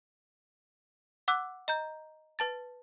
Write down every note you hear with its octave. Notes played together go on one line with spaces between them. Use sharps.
F#5 D6 E6 F#6
D#5 A#5 G6
B4 A5 A6